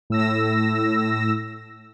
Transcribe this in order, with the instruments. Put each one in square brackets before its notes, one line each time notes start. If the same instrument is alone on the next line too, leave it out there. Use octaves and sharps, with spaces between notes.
[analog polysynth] A2 E6 A#6